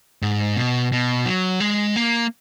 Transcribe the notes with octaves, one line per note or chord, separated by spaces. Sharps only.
G#2
B2
B2
F#3
G#3
A#3